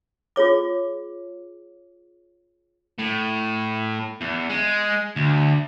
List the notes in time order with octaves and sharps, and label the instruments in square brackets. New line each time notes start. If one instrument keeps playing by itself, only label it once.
[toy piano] F4 G#4 C#5 D6
[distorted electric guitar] A2
E2
G#3
D2